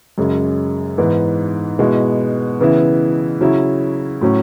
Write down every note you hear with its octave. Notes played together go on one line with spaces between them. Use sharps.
F#2 C#3 G#3
G#2 E3 B3
B2 G#3 B3 E4
C#3 E3 B3 E4
C#3 F#3 C#4 E4
A2 F#3 C#4